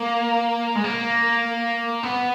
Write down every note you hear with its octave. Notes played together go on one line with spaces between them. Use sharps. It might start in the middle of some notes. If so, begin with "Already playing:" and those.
Already playing: A#3
G#3
A#3
B3